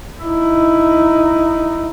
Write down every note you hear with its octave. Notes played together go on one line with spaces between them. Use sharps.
D#4 E4